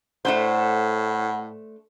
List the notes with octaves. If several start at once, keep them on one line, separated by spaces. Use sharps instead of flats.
A2 A3 D4 C5 F#5